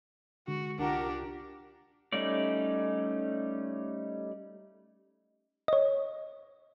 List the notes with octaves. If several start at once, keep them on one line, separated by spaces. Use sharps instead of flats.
D3 G#3 F#4
C2 D4 F4 G4 A#4 F#5
G3 A3 C#4 D#4 D5
C#5 D#5